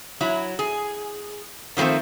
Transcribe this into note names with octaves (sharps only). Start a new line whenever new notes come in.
F#3 E4
G#4
D#3 F3 F#3 A3 C4